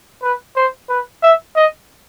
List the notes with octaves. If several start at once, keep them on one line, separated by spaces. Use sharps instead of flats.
B4
C5
B4
E5
D#5